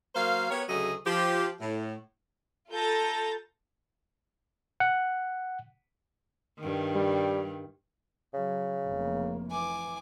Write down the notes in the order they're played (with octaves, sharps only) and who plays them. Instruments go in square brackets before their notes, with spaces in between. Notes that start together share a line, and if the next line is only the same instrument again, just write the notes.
[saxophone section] F#3 A#3 A#4 C5 F5
B3 G4 A#4 C#5
D2 C#3 F#3 A3 G#4 D#5
F3 G4
A2
[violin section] F4 A4 A#5 G6 A6 A#6
[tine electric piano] F#5
[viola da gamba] G2 D#3
[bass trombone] G3
[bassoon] C#3 [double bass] F#3
[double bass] F1 A#3
[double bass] E3 [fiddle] G#5 D6